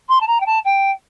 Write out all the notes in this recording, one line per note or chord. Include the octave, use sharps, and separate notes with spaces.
C6
A5
A#5
G5
A5
G5